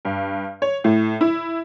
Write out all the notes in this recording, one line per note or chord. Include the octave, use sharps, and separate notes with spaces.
G2
C#5
A2
E4